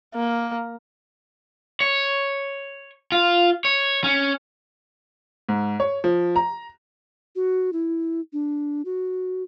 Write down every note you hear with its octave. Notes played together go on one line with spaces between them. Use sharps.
A#3
C#5
F4
C#5
C#4
G#2
C#5
F3
A#5
F#4
E4
D4
F#4